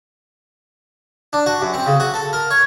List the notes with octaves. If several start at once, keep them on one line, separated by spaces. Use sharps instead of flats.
D4
F#4
F#2
C4
C#3
F#4
A4
A#4
C#5